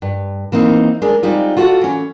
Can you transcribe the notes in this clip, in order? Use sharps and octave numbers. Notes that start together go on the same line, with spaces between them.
G2
E3 A#3 C4 D#4
G#3 D4 G#4 A#4
G3 G#3 C4 D#4 F4
F4 F#4 A4 F#5
E3 C#4